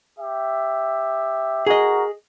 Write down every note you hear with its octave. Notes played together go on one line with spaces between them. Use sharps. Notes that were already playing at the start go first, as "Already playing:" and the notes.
G4 E5
F#4 G#4 A#4 D#5